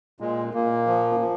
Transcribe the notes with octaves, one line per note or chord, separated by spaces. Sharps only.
A#2 G#3
A#2 A#3
F3
F3